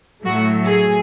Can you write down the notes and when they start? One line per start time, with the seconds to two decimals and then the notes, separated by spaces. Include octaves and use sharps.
0.24 A2 F#3 A3 F#4
0.68 G#4